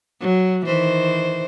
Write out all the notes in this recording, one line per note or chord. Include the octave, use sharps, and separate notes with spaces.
F#3
D#3 E3 C5